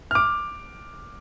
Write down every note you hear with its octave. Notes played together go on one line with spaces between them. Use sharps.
D6 F6